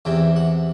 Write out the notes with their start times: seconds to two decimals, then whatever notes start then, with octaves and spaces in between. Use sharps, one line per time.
0.05 E2 C3 E3 G5
0.36 F#5